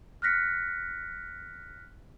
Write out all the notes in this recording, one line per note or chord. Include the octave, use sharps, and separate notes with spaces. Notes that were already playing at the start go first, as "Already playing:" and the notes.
F6 F#6 A#6 B6 C#7